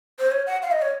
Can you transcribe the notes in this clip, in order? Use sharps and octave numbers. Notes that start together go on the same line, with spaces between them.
C5
C#5
F#5
F5
D#5
C#5